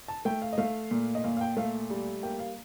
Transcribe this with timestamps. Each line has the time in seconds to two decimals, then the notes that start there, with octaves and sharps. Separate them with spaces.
0.08 A5
0.25 A3 G5
0.42 F5
0.53 D#5
0.58 A3 F5
0.91 A#2
1.15 D#5
1.24 A#2 F5
1.37 F5
1.41 G5
1.57 A3 F5
1.90 G3
2.23 A#3 G5
2.39 F5